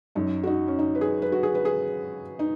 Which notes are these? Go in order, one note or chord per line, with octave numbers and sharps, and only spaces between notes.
F#2 F#3 D#4
F#4
D#4
C#4
D#4
B4
G#4
B4
F#4
G#4
B4
G#4
D#4